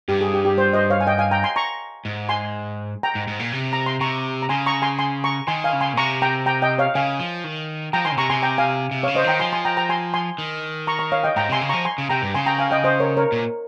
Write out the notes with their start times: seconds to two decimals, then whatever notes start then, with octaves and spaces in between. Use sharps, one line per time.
0.08 G2 G4
0.21 G#4
0.34 G4
0.45 G4
0.58 C5
0.73 C5 D#5
0.90 C#5 F5
1.01 G#5
1.07 D#5 G5
1.18 F5 G#5
1.31 G5 A#5
1.43 G#5 C6
1.56 A#5 C#6
2.05 G#2
2.29 G#5 C6
3.03 G5 A#5
3.15 G#2
3.27 G#2
3.39 A#2
3.52 C3
3.73 A#5
3.86 C6
4.01 C3 A#5 C#6
4.42 A#5
4.49 C#3 G#5 C6
4.66 A#5 C#6
4.82 G#5 C6
4.99 G#5 C6
5.24 A#5 C#6
5.47 D#3 G#5 C6
5.64 F5 G#5
5.73 C#3
5.81 G#5 C6
5.93 A#2
5.97 C3 A#5 C#6
6.22 G5 A#5
6.46 G5 A#5
6.62 D#5 G5
6.79 C#5 F5
6.95 C#3 F5 G#5
7.19 F3
7.44 D#3
7.93 F3 G5 A#5
8.05 D#3 G#5 C6
8.12 C#3
8.17 C3 A#5 C#6
8.30 C3 G#5 C6
8.42 G5 A#5
8.58 F5 G#5
8.91 C3
9.03 C#3 C#5 F5
9.15 C5 D#5
9.24 D#3 G5 A#5
9.40 F3 G#5 C6
9.53 G#5 C6
9.65 G5 A#5
9.77 G5 A#5
9.89 G#5 C6
10.14 G#5 C6
10.38 D#3
10.87 A#5 C#6
10.99 A#5 C#6
11.12 C#5 F5
11.24 D#5 G5
11.36 G#2 G5 A#5
11.49 C3 G#5 C6
11.61 C#3
11.69 F3 A#5 C#6
11.85 G#5 C6
11.98 C#3
12.09 C3 G5 A#5
12.22 G2
12.34 C#3 G#5 C6
12.46 G5 A#5
12.58 F5 G#5
12.71 D#5 G5
12.84 C5 D#5
13.00 A#4 C#5
13.17 A#4 C#5
13.32 A#2